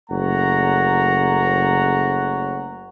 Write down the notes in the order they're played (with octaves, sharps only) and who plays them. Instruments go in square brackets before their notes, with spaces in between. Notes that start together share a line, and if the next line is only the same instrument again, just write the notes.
[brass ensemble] F#1 A3 C#5 F#5 A#5